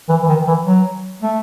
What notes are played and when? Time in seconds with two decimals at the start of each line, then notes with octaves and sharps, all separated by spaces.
0.09 E3
0.23 E3
0.28 D#3
0.48 E3
0.65 F#3
1.22 A3